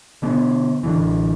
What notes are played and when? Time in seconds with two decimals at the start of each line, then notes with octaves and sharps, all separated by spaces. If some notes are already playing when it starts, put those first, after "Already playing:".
0.22 B2 D3 B3
0.83 A1 D3 E3